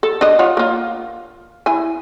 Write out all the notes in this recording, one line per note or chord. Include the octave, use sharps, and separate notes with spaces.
A4
D4 D#5
F4 C#5 F#5
A#3 F4
E4 G#5